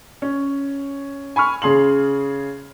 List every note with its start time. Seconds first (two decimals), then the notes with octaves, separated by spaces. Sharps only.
0.22 C#4
1.36 G#5 B5 C#6 F6
1.62 C#3 G#4 C6 F#7